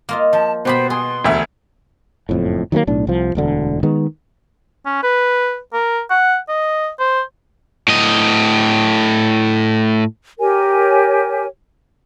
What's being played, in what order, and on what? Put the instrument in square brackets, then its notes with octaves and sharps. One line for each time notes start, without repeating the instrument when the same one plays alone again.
[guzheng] A#3 F4 D#5
[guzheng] F3 [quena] A5
[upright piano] B2 [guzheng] B3 G4 B5 [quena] C5
[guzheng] G#4 [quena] C6
[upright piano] E1 D2 E5
[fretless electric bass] F#1 F2 A2
D#3 F#3 A3 A#3
B1 A2 D4
C2 F3
E1 D2 D3
D#3 G#3 B3
[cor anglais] C#4
B4
A#4
F#5
D#5
C5
[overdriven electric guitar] A2 D#5
[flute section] G4 A#4 C#5 G#5